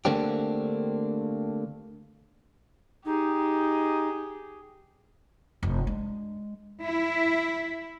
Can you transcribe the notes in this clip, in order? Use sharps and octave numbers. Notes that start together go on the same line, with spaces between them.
D3 A3 A#3 C4 D4 G4
D#4 G4 G#4
F1 G2
G#3 D4
E4